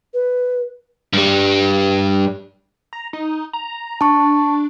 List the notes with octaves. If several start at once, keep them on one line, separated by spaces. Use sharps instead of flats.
B4
G2 G3
A#5
D#4
A#5
D4 A5 C#6